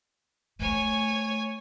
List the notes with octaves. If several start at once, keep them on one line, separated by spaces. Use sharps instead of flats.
A3 C#5 G#5